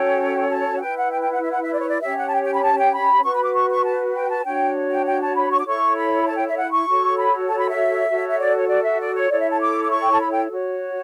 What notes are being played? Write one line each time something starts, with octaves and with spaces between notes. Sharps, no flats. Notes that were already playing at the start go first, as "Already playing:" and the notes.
Already playing: C#4 F#4 A4 C#5 G5
A5
F#5
B4 G5
E4
F#5
G5
G5
F#5
E5
F#5
E5
D5
C#5
D5
C#4 G4 C#5 E5
F#5
A5
G5
G5
B5
A5
G5
B5
F#4 B4 C#6
B5
D6
C#6
C#6
A5
G5
A5
D4 F#4 C#5 G5
G5
G5
A5
B5
C#6
D6
E4 A4 C#5 C#6
B5
A5
G5
E5
F#5
C#6
F#4 A4 C#5
B5
A5
B5
E5
F#4 A4 C#5
E5
D5
C#5
D5
E5
D5
C#5
E4 A4 C#5 D5
E5
A5
D6
D6
C#6
G5
A5
B5
G5
F#4 C#5